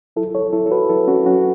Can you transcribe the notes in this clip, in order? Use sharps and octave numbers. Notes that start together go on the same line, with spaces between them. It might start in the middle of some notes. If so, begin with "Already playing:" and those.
F#3 E4 A4
A4 C#5
F#3 E4 A4
A4
F#4 B4
F#3 E4 A4
C#4 F#4
F#3 C#4 F#4